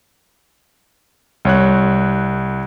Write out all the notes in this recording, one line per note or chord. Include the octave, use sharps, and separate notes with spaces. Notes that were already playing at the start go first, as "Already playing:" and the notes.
C2 C#5 F#6